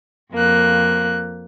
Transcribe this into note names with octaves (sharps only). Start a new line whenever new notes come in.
F2 A#3 F#6